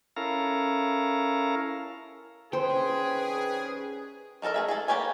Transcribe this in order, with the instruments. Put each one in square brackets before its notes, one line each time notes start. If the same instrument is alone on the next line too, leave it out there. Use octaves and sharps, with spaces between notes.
[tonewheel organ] C#4 E4 A4 A#4 F5 A#5
[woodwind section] C2 D#3 B4 [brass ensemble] C#4 G#4 [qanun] C5 [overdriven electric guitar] G5
[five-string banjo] D#3 D#4 A4 A#4 D#5
A3 G#4 E5
G#4 A4
A#3 B3 G4 C#5 G#5